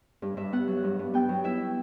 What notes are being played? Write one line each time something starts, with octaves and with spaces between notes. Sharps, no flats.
G2
G2 E5
B3 F#5
F#3
G2
G2
B3 G5
F#3
E4 E5